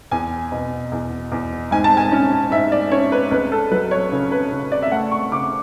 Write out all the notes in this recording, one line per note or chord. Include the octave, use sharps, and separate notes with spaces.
E2 G#5
B2
E2
E2
G#2 G#5
A5
G#5
C#4
G#2 E5
D5
C#4 C#5
B4
C#2 B4
A4
F#3 B4
C#5
C#3
B4
C#3
D5
E5
A3 F#5
C#6
C#3 D6